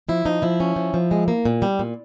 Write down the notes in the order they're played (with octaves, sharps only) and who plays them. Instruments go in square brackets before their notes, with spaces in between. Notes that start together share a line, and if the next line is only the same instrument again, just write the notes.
[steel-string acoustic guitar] F3 E4
F3 D#4
F3 E4
C#4
F3
F3
G#3
A#3
A#2
G3
A#2